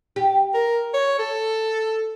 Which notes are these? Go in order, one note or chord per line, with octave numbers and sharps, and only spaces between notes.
G4
A#4
C#5
A4